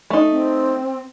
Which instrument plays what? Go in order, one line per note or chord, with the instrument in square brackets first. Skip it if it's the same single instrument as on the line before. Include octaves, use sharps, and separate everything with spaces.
[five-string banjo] A3 D#4
[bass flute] C4